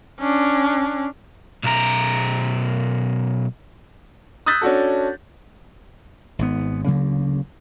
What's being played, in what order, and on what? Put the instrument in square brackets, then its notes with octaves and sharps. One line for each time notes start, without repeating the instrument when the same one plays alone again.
[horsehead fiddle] C#4 D4
[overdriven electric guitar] B1 A#4
[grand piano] D#6 E6 F#6 G6 A6 B6
C#4 D4 F#4 A4
[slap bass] G#1 G#2 B3
D2 C#3 F#3 A#3